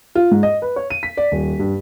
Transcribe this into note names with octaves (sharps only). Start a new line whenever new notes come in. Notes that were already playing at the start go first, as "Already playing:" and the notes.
F4
G#2
D#5
B4
C#5
D#7
B6
D5
D#1
G2